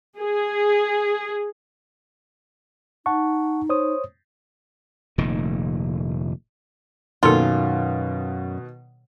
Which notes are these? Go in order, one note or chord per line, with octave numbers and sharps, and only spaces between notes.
G#4
D#4 F#5 A5 C#6
C5 C#5 D#6
F1 A#2 D#3
F#2 B2 D#3 A#3 F4 A4